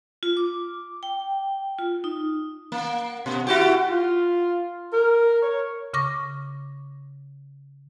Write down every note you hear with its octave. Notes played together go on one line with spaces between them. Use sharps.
F4
D6
G5
F4
D#4
A#3
B2
E4 F#4 G4
F4
A#4
C#5
C#3 C#6 D6 A#6